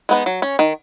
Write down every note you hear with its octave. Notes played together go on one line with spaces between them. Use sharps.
G#3 B3 D#4
F#3
C#4
D#3